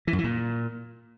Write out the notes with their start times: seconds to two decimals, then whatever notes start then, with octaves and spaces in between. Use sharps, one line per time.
0.07 E3
0.13 F#2
0.18 E3
0.24 A#2